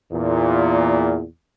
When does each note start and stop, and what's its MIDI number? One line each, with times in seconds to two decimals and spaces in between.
0.12 1.23 40
0.12 1.23 46